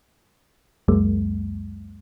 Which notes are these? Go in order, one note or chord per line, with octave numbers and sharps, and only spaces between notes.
C#2 F#2 F#3 G#3 A#3